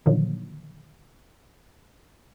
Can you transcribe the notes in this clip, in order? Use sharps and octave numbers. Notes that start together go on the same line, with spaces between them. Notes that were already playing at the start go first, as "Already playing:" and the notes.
A#2 D3 D#3 F3 F#3 A#3